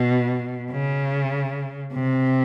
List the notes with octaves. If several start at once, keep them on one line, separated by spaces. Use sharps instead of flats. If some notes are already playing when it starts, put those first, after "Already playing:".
Already playing: B2
C#3
C3